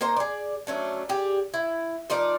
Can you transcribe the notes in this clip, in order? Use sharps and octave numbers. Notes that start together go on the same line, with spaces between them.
A#3 D#4 C5 A#5
G#4 D5
F#3 A3 C#4 D4
G4 G#4 D5
E4
F3 D#4 A#4 D5